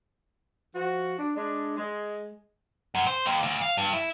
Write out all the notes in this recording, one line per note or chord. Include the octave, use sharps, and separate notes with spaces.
F3 F#4
D4
G#3 D4
G#3
F#2
C5
D#2
D2
F5
G2
E4